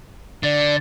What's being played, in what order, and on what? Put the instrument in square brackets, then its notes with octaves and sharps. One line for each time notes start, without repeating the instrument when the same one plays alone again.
[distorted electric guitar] D3 [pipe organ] D5